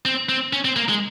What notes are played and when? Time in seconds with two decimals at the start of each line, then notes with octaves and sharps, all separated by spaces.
0.05 C4
0.29 C4
0.53 C#4
0.65 C4
0.76 A#3
0.89 G#3